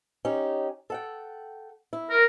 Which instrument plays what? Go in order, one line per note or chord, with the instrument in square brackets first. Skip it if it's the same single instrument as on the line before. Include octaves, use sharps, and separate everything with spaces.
[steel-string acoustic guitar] C#4 D#4 G4
A4 F#5 G5
E4
[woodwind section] A#4